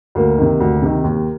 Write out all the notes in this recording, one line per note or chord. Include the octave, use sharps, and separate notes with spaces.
D2 A#3
C3 D#3
D2
C3 D#3
D#2